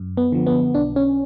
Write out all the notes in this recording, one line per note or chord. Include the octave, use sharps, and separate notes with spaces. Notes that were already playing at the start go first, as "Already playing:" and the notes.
Already playing: F#2
B3
D3 F3
B3
B1 D4
C#4